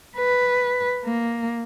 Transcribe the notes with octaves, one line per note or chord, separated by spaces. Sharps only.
B4
A#3